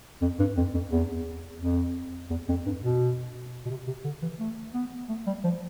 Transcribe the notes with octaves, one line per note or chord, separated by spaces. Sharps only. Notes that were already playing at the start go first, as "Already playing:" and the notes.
F2
G2
F2
F2
E2
F2
E2
F2
G2
B2
B2
C3
C3
D3
E3
A3
B3
A3
G3
F3